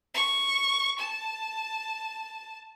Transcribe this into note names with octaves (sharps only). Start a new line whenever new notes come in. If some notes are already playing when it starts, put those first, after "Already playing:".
C#6
A5